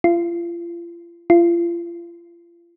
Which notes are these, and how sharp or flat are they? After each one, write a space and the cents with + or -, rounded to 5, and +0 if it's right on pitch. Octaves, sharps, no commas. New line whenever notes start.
F4 -35
F4 -35